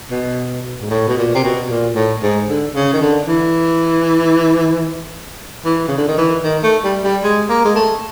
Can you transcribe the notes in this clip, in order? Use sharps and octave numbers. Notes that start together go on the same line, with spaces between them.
B2
G#2
A2
B2
A#2
C3
B2
A#2
A2
G#2
D3
C#3
D#3
D3
E3
E3
C#3
D3
D#3
E3
D#3
A3
G3
G3
G#3
A#3
G#3
A3